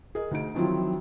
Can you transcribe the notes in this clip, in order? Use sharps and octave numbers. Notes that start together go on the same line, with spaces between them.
G#4 A#4 D#5
D2 D#4 D7
D#3 F3 F#3 C4 E4 F4